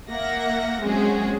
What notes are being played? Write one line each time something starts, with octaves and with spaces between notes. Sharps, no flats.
A#3 E5 F#5 A#6
F#3 G#3 C4 C#4 F#4 G#4